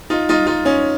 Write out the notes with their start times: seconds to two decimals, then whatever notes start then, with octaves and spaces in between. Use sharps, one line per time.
0.10 D#4 F4
0.29 D#4 F4
0.47 D#4 F4
0.65 C#4 D#4